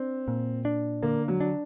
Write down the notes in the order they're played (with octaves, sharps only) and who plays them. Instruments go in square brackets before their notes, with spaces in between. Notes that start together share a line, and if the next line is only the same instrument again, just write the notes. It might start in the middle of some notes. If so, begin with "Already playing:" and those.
Already playing: [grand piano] C4 [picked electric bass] D4
[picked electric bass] A#2
D4
[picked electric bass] D3 [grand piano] A#3
[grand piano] F#3
[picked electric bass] D4